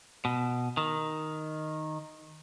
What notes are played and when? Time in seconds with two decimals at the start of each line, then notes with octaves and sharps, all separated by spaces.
0.25 B2
0.77 D#3